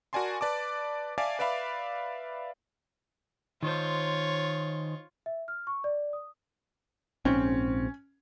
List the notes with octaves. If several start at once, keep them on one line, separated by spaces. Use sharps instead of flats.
F#4 A#4 D5 G#5 A5 C6
B4 D5 A5 D6
D5 E5 F5 G#5 A5 D6
B4 D5 E5 F5 B5
D#3 F4 C5 C#5
E5
F6
C#6
D5
D#6
A#1 G#2 C4 C#4